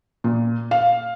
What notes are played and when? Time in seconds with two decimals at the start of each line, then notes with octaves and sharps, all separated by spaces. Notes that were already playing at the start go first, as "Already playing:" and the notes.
0.24 A#2
0.71 F5